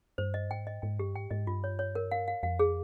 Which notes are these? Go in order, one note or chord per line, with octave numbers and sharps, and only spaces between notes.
G2 C5
D#5
G#2 G5
D#5
G#2 G5
G2 G4
G#2 G5
G#2 D#5
G2 F4
C#5
C#5
A#4
F5
F5
F2 F5
G#4